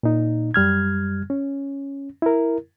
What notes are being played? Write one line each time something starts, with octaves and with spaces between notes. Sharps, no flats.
A#2 D#4
F#2 G3 F6 G#6
C#4
E4 A#4